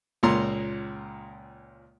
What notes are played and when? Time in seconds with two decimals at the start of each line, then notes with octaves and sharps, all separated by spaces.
0.23 C#2 A#2 G#3 A#5 C6